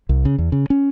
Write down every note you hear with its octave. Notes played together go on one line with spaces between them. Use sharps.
C2
C#3
E2
C#3
C#4